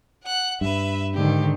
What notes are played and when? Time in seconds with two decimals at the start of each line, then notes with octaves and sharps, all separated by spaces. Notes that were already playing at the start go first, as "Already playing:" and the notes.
0.23 F#5 F#6
0.61 G2 B4 E5
1.14 G#2 D3 D#3 G4